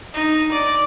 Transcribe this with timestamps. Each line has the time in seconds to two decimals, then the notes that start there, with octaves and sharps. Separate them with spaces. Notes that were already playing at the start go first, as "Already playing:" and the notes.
0.14 D#4
0.52 D5